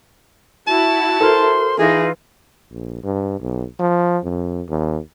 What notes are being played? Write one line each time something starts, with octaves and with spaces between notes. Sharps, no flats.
E4 F#4 A5
A4 A#4 C5 C6 F6
E3 D#4 F4 G#4
A#1
G2
B1
F3
F2
D#2